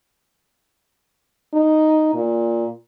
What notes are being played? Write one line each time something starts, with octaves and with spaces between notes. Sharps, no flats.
D#4
A#2